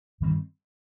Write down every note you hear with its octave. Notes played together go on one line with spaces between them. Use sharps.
G2 D#3 G3 C4